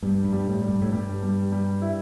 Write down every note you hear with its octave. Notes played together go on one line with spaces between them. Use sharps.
G2 G3
G2
G3
A2
G3
G2
A2
G2 G3
G3
G3
E4